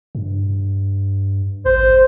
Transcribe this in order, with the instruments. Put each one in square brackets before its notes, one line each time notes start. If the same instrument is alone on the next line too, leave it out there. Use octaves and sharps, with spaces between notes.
[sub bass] G2
[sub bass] A1 [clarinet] C5